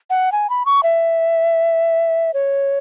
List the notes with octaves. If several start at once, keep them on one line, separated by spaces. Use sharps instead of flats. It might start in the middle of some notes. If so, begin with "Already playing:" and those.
F#5
G#5
B5
C#6
E5
C#5